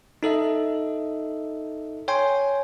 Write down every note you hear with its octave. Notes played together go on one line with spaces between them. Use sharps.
D#4 A4 D#5 E5
C#5 G5 G#5 C6